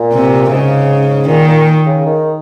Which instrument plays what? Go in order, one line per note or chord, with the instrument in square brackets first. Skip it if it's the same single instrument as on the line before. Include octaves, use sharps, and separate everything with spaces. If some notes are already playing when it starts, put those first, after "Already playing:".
Already playing: [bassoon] A#2
[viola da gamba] C3
[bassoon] G#2 [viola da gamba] C#3
[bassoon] A#2 [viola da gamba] D#3
[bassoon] A#2
C#3
D#3